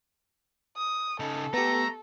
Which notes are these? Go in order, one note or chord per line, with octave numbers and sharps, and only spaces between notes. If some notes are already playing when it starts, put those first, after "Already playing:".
D#6
C#3 D#4 A4
A3 B3 G4 A#5